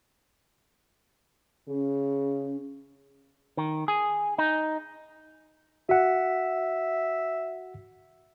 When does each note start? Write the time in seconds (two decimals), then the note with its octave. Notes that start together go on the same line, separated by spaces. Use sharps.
1.68 C#3 C#4
3.57 D#3
3.88 G#4
4.38 D#4
5.89 F#4 E5 F#5